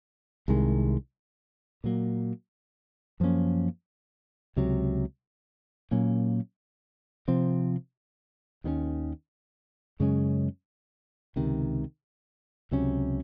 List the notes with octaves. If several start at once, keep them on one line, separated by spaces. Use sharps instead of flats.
C2 C3 D#3 G#3
A#2 F#3 A#3
F#2 F3 A#3 C#4
C#2 C3 F#3
A#2 F#3 A#3 C#4
C3 F3 C4
D#2 D#3 A#3 C#4
F#2 C#3 G#3 C#4
C#2 C3 D#3
C#2 C3 F#3 C#4